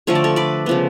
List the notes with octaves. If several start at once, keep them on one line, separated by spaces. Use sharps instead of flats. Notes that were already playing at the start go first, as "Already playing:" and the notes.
D3 F3 A3 C#5
D5
A4 C#5
B4 D5
C#3 F3 B3